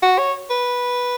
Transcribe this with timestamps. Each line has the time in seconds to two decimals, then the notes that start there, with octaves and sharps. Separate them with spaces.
0.03 F#4
0.18 C#5
0.50 B4